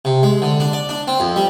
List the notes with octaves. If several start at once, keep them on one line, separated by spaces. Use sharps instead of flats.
C3
G#3
D3
D4
D5
D4
C4
F2
G3